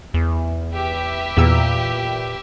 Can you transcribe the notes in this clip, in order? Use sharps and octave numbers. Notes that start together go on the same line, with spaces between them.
E2
G4 B4 E5
E2 A#2 E6